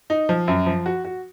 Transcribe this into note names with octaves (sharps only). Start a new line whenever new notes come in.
D#4
F3
F#2
F3
F#4
F#4